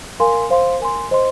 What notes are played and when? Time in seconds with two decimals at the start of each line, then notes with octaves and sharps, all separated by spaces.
0.20 A#4 F5 G#5 C6
0.50 C5 F5 C6
0.80 A#4 G#5 C6
1.11 C5 D#5 C6